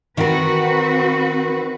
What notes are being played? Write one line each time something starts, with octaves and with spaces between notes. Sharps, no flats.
D#3 C4 F#4 A#4 B4